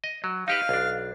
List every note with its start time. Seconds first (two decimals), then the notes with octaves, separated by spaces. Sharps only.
0.04 D#5
0.24 F#3
0.48 D#4 G4 B4 F5
0.69 B1 D4